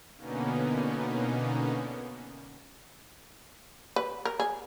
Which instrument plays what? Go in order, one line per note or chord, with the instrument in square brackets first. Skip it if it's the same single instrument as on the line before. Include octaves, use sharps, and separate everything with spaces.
[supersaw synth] B2 D3 A#3 B3 C#4 D#4
[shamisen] B4
A#4
G#4